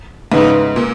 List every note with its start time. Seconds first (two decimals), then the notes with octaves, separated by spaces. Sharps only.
0.32 G#2 C#3 E3 B3 D#4
0.76 A#2